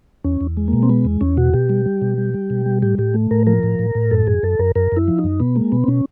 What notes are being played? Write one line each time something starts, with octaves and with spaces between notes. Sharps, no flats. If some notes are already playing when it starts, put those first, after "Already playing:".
E2 C#4
E2
G#3
A#3
B2
C4
G#3 B3
E2
E2 C#4
B2 F#4
B2 G4
G3
G3
B2
G3
G3
B2
G3
A2 G4
A2 G4
A3
A2 A#4
F3 A#4
A2
A2
A2
F#2 A4
F#2 G#4
F#2 A4
F#2 A#4
F#2 A#4
F#2 E4
F3
D#4
F#2
B2 B3
G#3 A#3
B2 B3
C4
B2 C#4